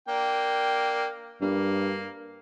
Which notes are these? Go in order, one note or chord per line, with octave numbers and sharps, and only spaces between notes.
A#3 D4 G5
G2 A#3